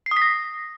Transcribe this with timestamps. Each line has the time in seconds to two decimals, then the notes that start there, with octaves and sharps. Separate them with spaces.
0.06 C7
0.11 D#6
0.17 B6
0.22 A#6